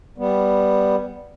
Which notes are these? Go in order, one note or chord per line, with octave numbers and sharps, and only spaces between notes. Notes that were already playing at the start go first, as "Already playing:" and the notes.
G3 B3